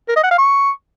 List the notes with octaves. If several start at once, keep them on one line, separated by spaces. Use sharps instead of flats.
A#4
D#5
F#5
F5
C#6